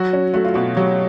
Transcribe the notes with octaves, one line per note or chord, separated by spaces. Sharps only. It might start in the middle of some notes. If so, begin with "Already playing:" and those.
Already playing: F#3 F#4
C#4
A3 F#4
F4
B2 F#4
F#3 G4